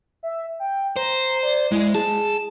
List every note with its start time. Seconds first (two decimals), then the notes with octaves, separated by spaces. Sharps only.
0.23 E5
0.60 G5
0.96 C5 A#5
1.43 D5
1.72 G#3 E4
1.95 G#4 A5